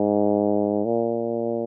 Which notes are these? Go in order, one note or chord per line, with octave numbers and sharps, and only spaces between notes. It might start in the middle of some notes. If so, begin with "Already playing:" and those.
Already playing: G#2
A#2